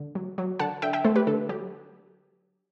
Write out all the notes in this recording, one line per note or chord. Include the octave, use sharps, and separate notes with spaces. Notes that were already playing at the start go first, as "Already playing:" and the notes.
Already playing: D3
F#3
F#3
D3 F#5 A5
D3 E5 G5
E5 G5
A3 A4 C5
G4 B4
D3 A4
F#3 G4